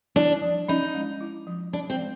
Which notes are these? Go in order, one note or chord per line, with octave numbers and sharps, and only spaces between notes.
D4 E4
F3
C#4 D#4
G#3
E4
F3
C#4 D4
C4
G#3